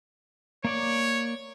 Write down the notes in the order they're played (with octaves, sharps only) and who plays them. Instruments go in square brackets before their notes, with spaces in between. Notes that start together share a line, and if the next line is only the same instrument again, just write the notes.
[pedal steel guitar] A#3 D5 D6 [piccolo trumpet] C#5